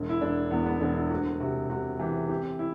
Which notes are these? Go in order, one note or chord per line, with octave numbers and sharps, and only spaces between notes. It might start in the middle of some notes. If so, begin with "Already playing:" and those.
Already playing: E1
E4
E1 D4
E2 B3
B3
E1 D4
E4
D2 F#4
C3 F#4
C3 F#4
E3 G4
C4 G4
E4